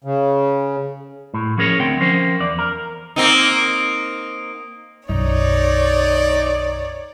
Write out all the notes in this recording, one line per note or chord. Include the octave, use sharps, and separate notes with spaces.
C#3
A2
F3 C#4 G#4 A#4 B4 C#5
D2 C4 G5
F3 C#4 A#4 C5
E2 D5
A#4
A#3 C4 D#4
B1 F#2 D#4 C#5 D5